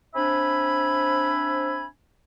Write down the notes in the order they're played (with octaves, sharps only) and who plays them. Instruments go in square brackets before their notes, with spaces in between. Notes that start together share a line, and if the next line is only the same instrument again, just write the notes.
[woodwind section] C4 D4 C5 E5 G#5 B5